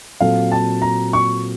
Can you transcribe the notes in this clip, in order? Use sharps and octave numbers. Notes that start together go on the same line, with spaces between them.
A#2 F#3 C4 F#4 A4 F5
A5
A#5
C#6